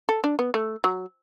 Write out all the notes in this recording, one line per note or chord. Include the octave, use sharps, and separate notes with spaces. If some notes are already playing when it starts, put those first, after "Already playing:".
A4
D4
B3
A3
F#3